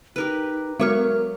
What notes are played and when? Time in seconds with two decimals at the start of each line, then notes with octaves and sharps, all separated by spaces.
0.16 D#4 G4 A#4 B4
0.80 F#3 G#3 F#4 A#4 C#5 C#6 F6